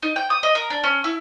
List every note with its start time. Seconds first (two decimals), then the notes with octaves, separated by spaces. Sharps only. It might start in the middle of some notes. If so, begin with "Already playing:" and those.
0.03 D#4
0.16 G5
0.30 D#6
0.43 D#5
0.55 A#4
0.70 D4
0.84 C#4
1.04 E4